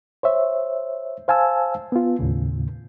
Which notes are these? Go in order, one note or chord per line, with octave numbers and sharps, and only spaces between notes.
C5 C#5 E5
C5 F5 G#5 A5 E6
B3 F4
D#2 A2 C#3